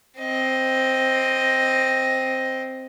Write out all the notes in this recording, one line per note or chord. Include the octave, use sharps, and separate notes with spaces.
C4 D#5